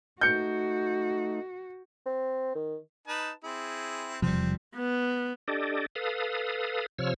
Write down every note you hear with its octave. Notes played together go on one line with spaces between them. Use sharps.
A3 D#4 F#4 G6 C#7
C4
D#3
D#4 B4 A5
C4 E4 G#4
E1 C3 F3 G3 C4
B3
D4 G4 A4 D5 D#5
A4 B4 F5 D#6
C3 F3 C#5 E6 F6